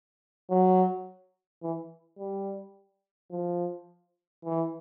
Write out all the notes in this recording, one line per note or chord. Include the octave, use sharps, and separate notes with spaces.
F#3
E3
G3
F3
E3